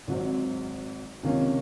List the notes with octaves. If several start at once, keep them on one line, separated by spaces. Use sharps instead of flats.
G#1 G#2 F#3 C4
C#2 C3 D#3 A#3 C#4